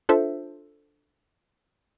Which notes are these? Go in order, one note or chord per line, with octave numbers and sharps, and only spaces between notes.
D4 F4 A4 C5 E5